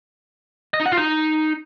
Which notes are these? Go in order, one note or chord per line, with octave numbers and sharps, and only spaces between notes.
D#5
D#4
F#5
F4
D#4